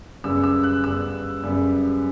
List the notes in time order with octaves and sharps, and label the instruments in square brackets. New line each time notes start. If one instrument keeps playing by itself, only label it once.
[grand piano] F#2 C#3 G3 B3 E6
E6
F#6
F#2 C#3 G3 B3 E6
F#2 C#3 G3 B3